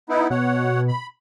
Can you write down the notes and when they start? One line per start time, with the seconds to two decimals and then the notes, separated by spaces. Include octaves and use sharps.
0.09 B3 D#4 E4
0.30 B2 C#5 F#5
0.88 B5